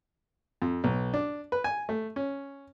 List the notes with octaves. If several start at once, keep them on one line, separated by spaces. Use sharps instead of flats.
F2
B1
D4
B4
G#5
A3
C#4